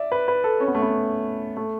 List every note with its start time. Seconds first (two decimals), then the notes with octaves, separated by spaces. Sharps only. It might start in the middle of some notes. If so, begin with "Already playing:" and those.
Already playing: D5 E5
0.12 B4
0.28 B4
0.44 A4
0.60 C#4
0.68 B3
0.75 A3
0.82 B3
1.57 A3